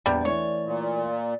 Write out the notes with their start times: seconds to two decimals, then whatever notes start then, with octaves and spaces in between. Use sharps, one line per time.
0.06 A#1 E2 G3 D5
0.25 E3 A3 C#5
0.65 A#2